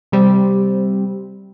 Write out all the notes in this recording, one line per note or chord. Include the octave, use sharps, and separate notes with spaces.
C3 G3 C4